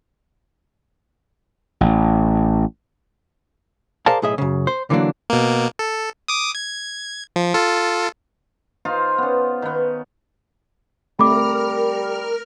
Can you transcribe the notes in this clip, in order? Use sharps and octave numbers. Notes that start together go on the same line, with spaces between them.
A1
G#4 A#4 C5 D5 F5 A5
B1 A2 G#4 D#5 E5
F#2 C#3
C5
D3 E3 F#3 A#3 D4
B2 A#3
A4
D6 D#6
G#6
F3
F4 A4
D#4 F4 C5 F5
B3 C#4
D#3 B3
G3 A3 C4 A#4 B5 D6 F6